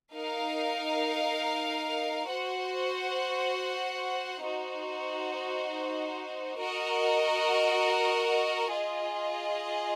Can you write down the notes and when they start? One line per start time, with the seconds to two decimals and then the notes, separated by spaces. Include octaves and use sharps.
0.14 D#4 A#4 F5
2.28 F#4 C5 F#5
4.43 D#4 F#4 C5
6.57 F#4 A#4 D#5
8.72 F4 G#4 D#5